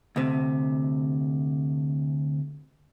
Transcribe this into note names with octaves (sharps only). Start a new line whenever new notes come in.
D2 C3